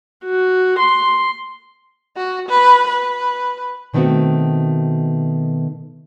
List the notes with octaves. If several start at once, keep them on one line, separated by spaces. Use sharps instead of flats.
F#4
C6
F#4
B4
B4
B2 D#3 A3 B3 C4 F#4